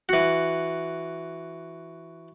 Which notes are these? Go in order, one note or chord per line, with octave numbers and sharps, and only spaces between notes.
E3 F#4